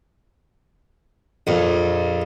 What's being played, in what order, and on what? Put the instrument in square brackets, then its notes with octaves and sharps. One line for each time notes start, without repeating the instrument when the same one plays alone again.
[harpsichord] A#1 F2